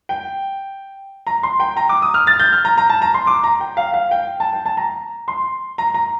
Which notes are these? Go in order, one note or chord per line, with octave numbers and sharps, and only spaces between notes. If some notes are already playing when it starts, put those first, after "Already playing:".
G5
A#5
C6
G5
A#5
D6
D#6
F6
A6
G6
F6
A#5
A#5
A5
A#5
C6
D6
A#5
G5
F5
F5
G5
A5
G5
A5
A#5
C6
A#5
A#5